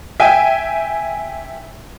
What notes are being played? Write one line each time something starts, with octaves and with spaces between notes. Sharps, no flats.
E5 G5 G#5